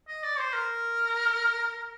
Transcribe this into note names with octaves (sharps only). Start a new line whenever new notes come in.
D#5
D5
C5
A#4